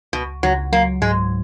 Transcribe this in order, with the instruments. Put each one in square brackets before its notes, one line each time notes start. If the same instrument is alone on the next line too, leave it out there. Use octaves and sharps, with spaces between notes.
[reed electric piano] C#2 [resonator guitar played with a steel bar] B2
[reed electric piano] C#2 [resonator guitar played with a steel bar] F#3
[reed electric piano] F#3 [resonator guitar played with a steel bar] A#3
[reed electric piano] G#2 [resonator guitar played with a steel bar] G#3